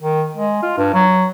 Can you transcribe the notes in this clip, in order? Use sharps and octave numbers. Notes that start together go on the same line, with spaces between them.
D#3
G#3
F4
G2
F#3